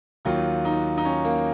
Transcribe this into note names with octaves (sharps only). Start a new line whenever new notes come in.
D#2 D#3 F#3 F4
D#4
D#4
C#4
A#3